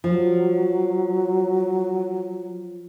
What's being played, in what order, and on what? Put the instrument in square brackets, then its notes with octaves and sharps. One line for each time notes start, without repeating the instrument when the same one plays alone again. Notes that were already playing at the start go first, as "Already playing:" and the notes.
[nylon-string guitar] F3 [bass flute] F#3